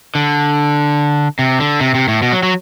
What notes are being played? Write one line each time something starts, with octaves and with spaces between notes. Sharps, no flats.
D3
C3
D3
C3
C3
A2
B2
F#3
F#3